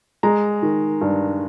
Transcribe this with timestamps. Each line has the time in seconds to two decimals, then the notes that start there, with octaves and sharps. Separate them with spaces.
0.23 G#3 A#5
0.62 D#3
1.01 G2